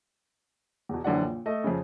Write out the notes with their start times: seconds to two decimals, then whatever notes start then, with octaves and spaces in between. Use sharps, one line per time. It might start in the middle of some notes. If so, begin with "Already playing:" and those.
0.89 E2 B2
1.04 A#1 F#2 D3 E3 D5 F#5
1.24 A#2
1.46 A3 D#5
1.64 F2 C#3